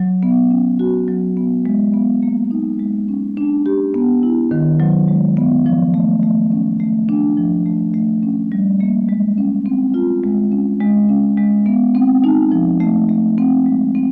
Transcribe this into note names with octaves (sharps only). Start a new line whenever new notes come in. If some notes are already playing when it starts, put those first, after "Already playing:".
Already playing: F#3
B3
C#4
F#4
F#3
B3
G#3
B3
A#3
D#4
G#3
C#4
D4
G4
B3
E4
D#3
F#3
G#3
B3
F3
A3
A3
C#4
A3
D4
F3
A3
A3
C#4
G3
A#3
G#3
C#4
C4
F4
G#3
C#4
G#3
C#4
G#3
B3
C4
D#4
F3
A3
A3
C4
G#3
C4